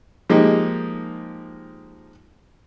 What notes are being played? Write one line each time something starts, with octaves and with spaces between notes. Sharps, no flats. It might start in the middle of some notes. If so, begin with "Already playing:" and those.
F3 G#3 A#3 D#4 G4 D#5